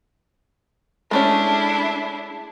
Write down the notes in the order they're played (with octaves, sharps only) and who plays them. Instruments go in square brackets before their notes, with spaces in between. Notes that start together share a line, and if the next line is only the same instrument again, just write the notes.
[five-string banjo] G#3 A3 C#4 [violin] D4 E4